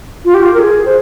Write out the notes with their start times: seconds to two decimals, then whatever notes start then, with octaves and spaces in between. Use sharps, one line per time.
0.25 F4
0.34 G4
0.43 F4
0.54 A#4
0.59 G#4
0.86 C5